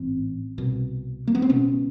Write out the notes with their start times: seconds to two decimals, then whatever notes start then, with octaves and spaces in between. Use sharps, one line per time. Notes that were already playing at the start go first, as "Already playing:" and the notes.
Already playing: A1 G#2 C4
0.58 C2 B2
1.27 A#3
1.35 B3
1.42 C4
1.49 C#2 B2 B3 C#4